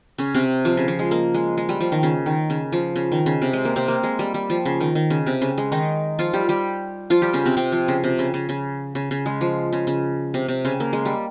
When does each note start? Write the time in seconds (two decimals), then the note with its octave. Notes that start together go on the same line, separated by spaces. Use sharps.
0.18 C#3 C#4
0.34 C3 C4
0.65 F3
0.77 C#3
0.88 F3
0.99 G#3
1.11 A#3
1.34 G#3
1.57 G#3
1.69 G3
1.80 F3
1.92 D#3
2.03 C#3
2.26 D#3
2.50 C#3
2.72 F3
2.96 C#3
3.12 D#3
3.26 C#3
3.42 C3
3.53 G#3
3.65 A#3
3.76 C3 C4
3.88 A#3
4.03 G#3
4.19 G3
4.34 G3
4.50 F3
4.65 C#3
4.80 D#3
4.95 D#3
5.10 C#3
5.26 C3
5.41 C#3
5.58 G#3
5.72 D#3 D#4
6.19 F3 F4
6.33 G3 G4
6.49 G3 G4
7.10 F3 F4
7.22 G3 G4
7.33 C#3 C#4
7.45 C3 C4
7.57 C3 C4
7.72 F3
7.88 C#3
8.04 C3
8.19 C#3
8.34 C#3
8.49 C#3
8.95 C#3
9.11 C#3
9.26 G#3
9.41 F3
9.73 C#3
9.87 C#3
10.34 C3
10.48 C3
10.65 C#3
10.80 A#3
10.93 G#3
11.05 G3